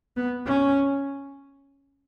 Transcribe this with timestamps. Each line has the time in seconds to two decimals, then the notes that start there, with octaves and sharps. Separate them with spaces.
0.17 B3
0.46 C#4